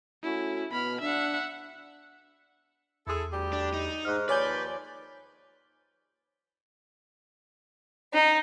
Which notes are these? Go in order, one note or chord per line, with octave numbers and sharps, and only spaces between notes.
A3 C#4 E4 F#4
B2 B3 B5 F6
D4 E5 F#5
E2 E4 G#4 A4
D2 G3 G4
D4
D#4
G#2 F6 F#6
D#2 F3 B4 C#5 D5 G#5 G6
D#4